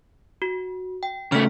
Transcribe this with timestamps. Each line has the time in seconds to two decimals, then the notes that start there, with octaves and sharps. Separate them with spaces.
0.42 F#4
1.03 G5
1.32 C#3 A3 F6 B6